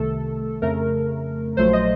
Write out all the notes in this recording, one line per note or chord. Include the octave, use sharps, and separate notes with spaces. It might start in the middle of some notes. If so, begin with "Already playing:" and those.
Already playing: C2 C3 D#3 A3 A4
F2 C#3 A3 A#4
A#1 A#2 F#3 A3 C5
D#5